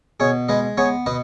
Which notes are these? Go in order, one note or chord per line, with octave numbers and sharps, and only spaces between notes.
B2 G#4 C#5
G#3 B4 D#5
B3 G#4 C#5
B2 B4 D#5